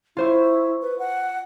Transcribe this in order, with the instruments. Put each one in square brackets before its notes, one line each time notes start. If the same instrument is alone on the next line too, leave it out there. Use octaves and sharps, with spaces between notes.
[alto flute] E4 [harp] F4 C5 C#6
[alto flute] B4
F#5